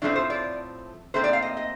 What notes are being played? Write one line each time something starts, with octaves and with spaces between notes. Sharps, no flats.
A2 F3 A3 C4 D4
C5
D5
A#2 A3 C4 C5
D5
F5
D#5
D#5